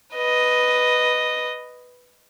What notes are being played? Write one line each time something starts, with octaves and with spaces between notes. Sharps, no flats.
B4 D#5